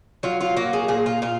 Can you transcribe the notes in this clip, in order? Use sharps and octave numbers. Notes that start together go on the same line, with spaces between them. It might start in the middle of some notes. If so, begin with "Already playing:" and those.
F#3 F4
F4
A#3 F#4
G#4
A#2 G#4
F4
A#2 F4